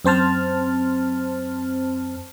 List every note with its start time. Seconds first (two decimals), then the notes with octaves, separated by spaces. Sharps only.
0.04 F#2 C4 C5 A5 F6